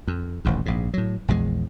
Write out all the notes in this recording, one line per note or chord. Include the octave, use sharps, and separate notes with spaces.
F2
D#1 A1 D#2
A#1 G#2
A2 F#3
A#1 E2 D#3 G#3